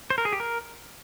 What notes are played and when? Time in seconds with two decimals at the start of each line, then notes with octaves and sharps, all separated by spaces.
0.10 C5
0.18 A#4
0.25 G#4
0.33 G4
0.40 A#4